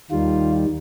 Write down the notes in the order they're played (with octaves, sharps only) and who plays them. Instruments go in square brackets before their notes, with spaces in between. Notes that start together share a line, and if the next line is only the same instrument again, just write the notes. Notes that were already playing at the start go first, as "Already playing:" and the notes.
[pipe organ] D#2 D#3 G3 F4